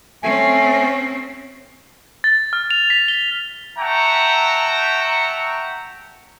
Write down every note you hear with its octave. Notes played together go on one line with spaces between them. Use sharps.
A3 C4 C#4 G#5
A6
F6
F7
B6
G7
E5 F#5 G5 A5 A#5 C#6